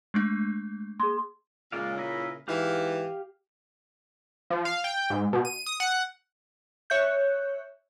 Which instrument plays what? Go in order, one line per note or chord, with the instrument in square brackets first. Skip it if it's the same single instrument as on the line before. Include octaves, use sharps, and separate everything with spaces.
[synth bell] G#3 A3 D4
[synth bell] A#3 [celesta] G#4 C6
[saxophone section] A#2 C#3 [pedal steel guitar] G#3 D5 F5
[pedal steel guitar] E4 A#4 B4
[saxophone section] G#2 E3 [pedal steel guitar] G4 F5
[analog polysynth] F3
F5
G5
G#2
B2
D#7
D#6
F#5
[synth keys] C#5 E5 F#6 G6